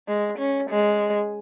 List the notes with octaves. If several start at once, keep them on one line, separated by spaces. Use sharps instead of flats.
G#3
C#4
G#3